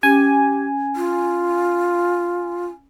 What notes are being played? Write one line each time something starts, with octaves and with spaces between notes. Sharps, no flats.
C#4 G4 G#5
F4